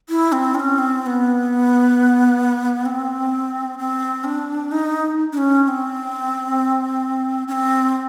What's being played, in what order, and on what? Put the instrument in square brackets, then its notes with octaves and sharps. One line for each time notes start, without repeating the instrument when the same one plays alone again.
[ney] E4
C4
D4
C#4
C4
C4
B3
C4
C4
D4
D#4
D4
C#4
C#4
C4
C#4
C4